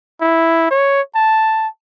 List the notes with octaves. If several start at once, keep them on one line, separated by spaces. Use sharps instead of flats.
E4
C#5
A5